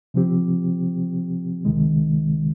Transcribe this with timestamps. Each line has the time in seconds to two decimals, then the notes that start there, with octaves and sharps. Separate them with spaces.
0.14 C3 F3 C4 G4
1.65 C#2 C3 D#3 G#3